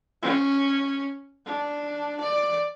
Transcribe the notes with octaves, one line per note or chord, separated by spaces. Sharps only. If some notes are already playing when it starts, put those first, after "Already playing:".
C#4
D4
D5